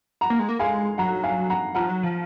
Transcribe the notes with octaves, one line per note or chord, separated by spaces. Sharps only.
F#5 A#5
A#3
G#3
A#3
G#3 F5 G#5
F#3 F#5 A#5
F5 G#5
F#5 A#5
F3 F#5 A#5
F#3
F3